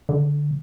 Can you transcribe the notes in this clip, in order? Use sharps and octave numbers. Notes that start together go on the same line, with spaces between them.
D3